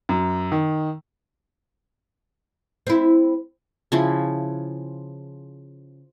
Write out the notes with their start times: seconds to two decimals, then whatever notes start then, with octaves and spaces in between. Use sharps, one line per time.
0.09 F#2
0.52 D#3
2.87 C4 E4
3.92 C#3 F3 E4